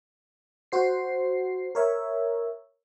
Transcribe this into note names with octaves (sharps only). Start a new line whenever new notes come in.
F#4 C5 C7
A#4 C#5 E5